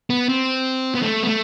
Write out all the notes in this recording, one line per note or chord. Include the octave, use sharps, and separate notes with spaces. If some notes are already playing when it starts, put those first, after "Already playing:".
B3
C4
B3
A3
B3
A3